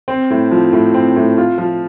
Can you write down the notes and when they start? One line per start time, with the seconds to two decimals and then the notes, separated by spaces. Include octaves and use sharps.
0.08 C4
0.30 A2
0.51 F3
0.73 A2
0.94 C4
1.16 A2
1.38 F4
1.58 F3